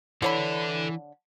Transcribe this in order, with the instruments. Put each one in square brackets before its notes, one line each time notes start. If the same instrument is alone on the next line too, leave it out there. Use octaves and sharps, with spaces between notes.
[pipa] D3 C#5 B5 [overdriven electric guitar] E3 [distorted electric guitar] A4 D5